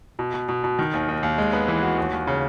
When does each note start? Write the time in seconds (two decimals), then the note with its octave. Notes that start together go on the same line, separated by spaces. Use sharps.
0.19 B2
0.34 B2
0.49 B2
0.64 B2
0.79 D#3
0.93 D#2
1.08 D#2
1.23 D#2
1.38 G#3
1.53 B3
1.68 E3
1.83 F#4
1.98 D#2
2.13 D#2
2.27 C#3